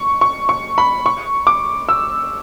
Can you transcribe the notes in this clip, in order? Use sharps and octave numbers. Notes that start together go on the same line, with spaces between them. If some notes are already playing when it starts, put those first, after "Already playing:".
Already playing: C#6
C#6
C#6
B5
C#6
D6
E6